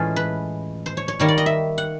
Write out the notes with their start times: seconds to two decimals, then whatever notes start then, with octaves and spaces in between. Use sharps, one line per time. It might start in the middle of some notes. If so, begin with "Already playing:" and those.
Already playing: A2 E3 G#3 C#4 F4 A4
0.16 B4
0.86 C5
0.97 C#5
1.08 C#5
1.20 D#3 G3 A#3 C#5
1.28 D5
1.38 D#5
1.46 E5
1.78 F#5